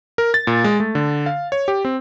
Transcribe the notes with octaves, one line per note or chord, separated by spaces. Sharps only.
A#4
A6
A#2
G#3
A3
D3
F5
C#5
G4
C4